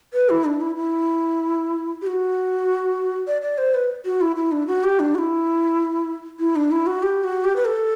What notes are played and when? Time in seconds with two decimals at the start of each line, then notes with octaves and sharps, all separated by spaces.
0.14 B4
0.30 E4
0.45 D4
0.61 E4
0.76 E4
2.02 G4
2.07 F#4
3.27 D5
3.42 D5
3.58 C5
3.74 B4
4.05 F#4
4.21 E4
4.36 E4
4.52 D4
4.67 F#4
4.84 G4
5.00 D4
5.15 F#4
5.19 E4
6.39 E4
6.56 D4
6.71 E4
6.87 F#4
7.03 G4
7.24 F#4
7.44 G4
7.56 B4
7.65 A4